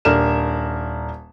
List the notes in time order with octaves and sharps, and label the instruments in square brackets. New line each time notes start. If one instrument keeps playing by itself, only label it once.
[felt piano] D#1 D4 A#4 E7